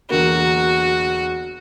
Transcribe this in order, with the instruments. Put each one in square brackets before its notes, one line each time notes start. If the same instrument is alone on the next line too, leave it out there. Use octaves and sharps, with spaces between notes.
[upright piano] E1 D3 A#3 [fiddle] F#4